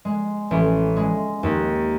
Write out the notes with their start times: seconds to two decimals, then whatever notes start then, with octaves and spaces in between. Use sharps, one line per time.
0.05 G#3
0.51 A1
0.96 G#3
1.43 D#2